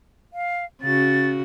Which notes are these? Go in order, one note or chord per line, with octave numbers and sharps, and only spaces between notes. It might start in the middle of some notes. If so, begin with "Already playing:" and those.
F5
C#3 F#4 A6